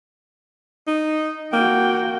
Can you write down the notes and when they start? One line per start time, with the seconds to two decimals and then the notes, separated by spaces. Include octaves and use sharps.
0.87 D#4
1.53 A#3 F#4 G5